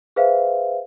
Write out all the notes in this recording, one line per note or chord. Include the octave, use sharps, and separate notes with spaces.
G#4 B4 C5 E5 F5